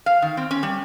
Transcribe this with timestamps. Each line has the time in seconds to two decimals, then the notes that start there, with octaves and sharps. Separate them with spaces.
0.06 F5
0.22 D#3
0.37 C4
0.51 C#4
0.63 G3